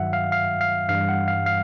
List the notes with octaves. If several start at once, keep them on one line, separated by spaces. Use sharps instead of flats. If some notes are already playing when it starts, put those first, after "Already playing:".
Already playing: G2 D#3 F#3 E5 F#5
F5
F5
F5
G2 E3 G3 F5
F#5
F5
F5